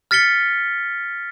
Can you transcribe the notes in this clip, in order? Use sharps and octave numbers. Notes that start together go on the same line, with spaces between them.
F6 A6 B6 C#7 G7